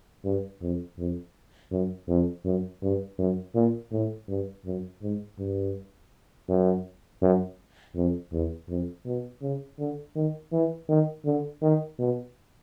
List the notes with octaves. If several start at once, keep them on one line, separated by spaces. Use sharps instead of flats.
G2
F2
F2
F#2
F2
F#2
G2
F#2
A#2
A2
G2
F#2
G#2
G2
F#2
F#2
F2
E2
F2
B2
C#3
D3
D#3
E3
D#3
D3
D#3
B2